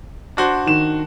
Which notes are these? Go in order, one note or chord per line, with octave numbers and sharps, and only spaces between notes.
D4 F#4 C5
D#3 E7